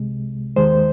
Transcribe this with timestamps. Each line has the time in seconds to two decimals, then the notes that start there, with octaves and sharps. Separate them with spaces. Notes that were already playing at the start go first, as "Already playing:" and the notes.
Already playing: C2 C3 G#3
0.56 D#2 D#3 G#3 C5